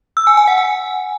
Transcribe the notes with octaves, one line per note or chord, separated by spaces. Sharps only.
E6
G#5
G#5
F#5
G#5